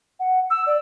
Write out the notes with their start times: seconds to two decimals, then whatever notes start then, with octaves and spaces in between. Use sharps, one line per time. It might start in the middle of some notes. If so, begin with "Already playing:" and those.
0.19 F#5
0.50 E6
0.66 D5